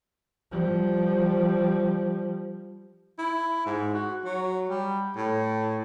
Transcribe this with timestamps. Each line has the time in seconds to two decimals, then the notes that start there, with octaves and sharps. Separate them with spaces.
0.51 F3 G3
3.18 E4
3.66 G#2
3.94 F#4
4.25 F#3
4.69 G3
5.17 A2